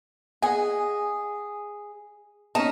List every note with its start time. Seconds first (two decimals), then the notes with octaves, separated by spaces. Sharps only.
0.42 G#4 D#5 F#5 G#5
2.55 C#4 D#4 D#5 A5